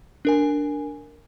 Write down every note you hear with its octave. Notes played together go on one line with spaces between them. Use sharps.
D4 A#4 G#5